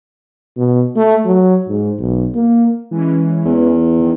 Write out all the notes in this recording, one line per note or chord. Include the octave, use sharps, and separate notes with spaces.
B2
A3
F#3
G#2
B1
A#3
E3 G#3 C#4
E2
D#3